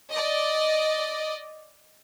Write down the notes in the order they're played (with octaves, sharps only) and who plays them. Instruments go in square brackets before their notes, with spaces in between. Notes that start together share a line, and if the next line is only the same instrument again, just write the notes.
[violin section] D5 D#5